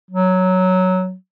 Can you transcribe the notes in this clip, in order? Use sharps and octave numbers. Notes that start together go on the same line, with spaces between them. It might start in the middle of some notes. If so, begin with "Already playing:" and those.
F#3